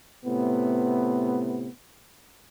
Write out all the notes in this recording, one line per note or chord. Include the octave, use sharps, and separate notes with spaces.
A2 C3 B3